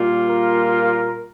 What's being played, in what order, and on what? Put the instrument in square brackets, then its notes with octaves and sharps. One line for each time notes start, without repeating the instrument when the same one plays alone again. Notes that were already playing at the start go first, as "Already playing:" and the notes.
Already playing: [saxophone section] A#2 G3 A#3 F4
[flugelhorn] A#4